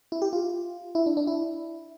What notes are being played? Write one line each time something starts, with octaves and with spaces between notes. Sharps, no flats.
E4
G4
F4
E4
D4
D4
E4